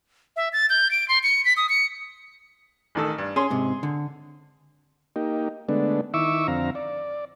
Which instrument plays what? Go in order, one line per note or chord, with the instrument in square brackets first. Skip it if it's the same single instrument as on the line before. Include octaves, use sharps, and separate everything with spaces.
[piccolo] E5
A6
G6
D7
C6
C#7
B6
D#6
C#7
[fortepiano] A1 D#3 A4
G2
[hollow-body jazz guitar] C#4 [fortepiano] G#4 C6
[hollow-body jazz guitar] G#2 C3
D3
[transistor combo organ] A#3 D#4 G4
D3 G#3 A3 B3 D4
D#3 E4 E5 C#6 D6 E6
F2 D3 C4 F5 A#5
D5